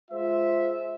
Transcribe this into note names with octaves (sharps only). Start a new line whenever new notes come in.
G#3 F4 C5 E5